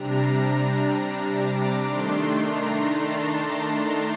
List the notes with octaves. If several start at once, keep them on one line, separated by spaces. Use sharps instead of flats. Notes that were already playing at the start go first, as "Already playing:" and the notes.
Already playing: C3 G3 D4 A#5
A#5
D6
D#3 A3 D4 C6
A#5
A5
A#5